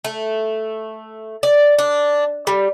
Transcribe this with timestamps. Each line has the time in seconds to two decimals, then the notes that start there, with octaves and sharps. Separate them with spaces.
0.05 A3
1.43 D5
1.79 D4
2.47 G3